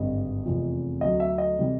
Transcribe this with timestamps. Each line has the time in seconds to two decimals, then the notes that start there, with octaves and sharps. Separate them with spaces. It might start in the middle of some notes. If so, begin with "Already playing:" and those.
Already playing: G#1 G2 D3 G3 D#5
0.45 F1 E2 C3 F3
1.01 D2 D3 F#3 D#5
1.20 E5
1.38 D#5
1.58 C3 E3 G3